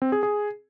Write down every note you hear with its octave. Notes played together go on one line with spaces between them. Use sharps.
C4
G#4
G#4